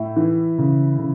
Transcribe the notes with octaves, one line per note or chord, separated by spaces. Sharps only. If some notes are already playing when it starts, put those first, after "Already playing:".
Already playing: A2 E4
E3
C#3
C#3